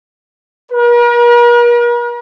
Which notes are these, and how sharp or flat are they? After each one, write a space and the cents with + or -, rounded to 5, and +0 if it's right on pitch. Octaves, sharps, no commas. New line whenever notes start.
A#4 +45